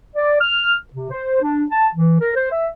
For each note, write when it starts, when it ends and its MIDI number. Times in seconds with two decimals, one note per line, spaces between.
0.16 0.41 74
0.41 0.74 89
0.94 1.10 48
1.11 1.40 72
1.42 1.64 62
1.71 1.88 81
1.95 2.19 52
2.21 2.32 70
2.36 2.52 72
2.52 2.68 76